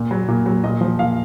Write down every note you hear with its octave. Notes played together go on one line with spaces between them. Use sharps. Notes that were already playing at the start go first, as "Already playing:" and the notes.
Already playing: A#2
F#3
A#2
F#3
A#2 D#5
F3
A#2 F5